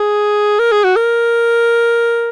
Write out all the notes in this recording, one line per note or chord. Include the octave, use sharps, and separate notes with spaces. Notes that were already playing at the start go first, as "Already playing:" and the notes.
Already playing: G#4
A#4
G#4
F#4
A#4